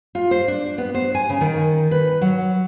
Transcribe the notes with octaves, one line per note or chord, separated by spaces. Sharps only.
F4
C5
D4
B3
C5
G#5
C#3
D#3
B4
F#3